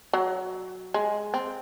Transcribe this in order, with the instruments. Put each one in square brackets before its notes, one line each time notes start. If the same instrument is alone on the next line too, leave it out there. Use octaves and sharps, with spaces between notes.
[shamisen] F#3
G#3
C4